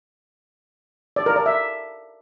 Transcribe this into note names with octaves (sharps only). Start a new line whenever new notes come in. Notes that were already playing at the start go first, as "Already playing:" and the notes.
D5
A#4
D5
E5